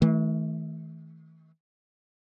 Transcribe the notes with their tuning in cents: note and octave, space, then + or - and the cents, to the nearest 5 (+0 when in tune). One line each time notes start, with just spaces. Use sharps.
E3 -45 A3 -5